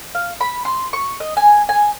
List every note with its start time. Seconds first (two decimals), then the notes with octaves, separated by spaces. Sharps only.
0.15 F5
0.41 B5
0.65 C6
0.93 C#6
1.20 D#5
1.37 G#5
1.69 G#5